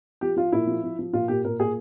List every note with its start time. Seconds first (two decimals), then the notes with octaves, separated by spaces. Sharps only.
0.21 F3 G4
0.36 F3 F4
0.52 A#2 E4
0.67 F3
0.83 F3
0.99 F3
1.13 A#2 F4
1.28 A#2 G4
1.45 A#2 A#4
1.60 A#2 G#4